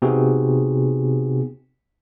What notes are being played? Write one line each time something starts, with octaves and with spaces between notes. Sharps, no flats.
C3 B3 C4 D#4 F#4 G#4